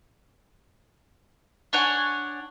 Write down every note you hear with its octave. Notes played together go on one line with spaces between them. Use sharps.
D4 C#5 F#5 G#5